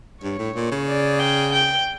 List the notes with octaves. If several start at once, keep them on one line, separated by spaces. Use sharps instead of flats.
G2 C#5
A2
A#2
C#3
D5
G5
G5